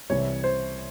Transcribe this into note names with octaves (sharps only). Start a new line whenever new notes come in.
C2 C3 E3 G3 C#5
C5